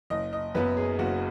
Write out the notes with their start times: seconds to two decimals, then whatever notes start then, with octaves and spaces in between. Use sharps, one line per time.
0.10 F#1 D#5
0.33 D#5
0.55 F#2 F#3 B3 B4
0.77 G#4
0.99 F#1 F#4